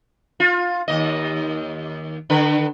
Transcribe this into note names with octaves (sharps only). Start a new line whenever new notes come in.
F4
D#2 D#5
D3 B4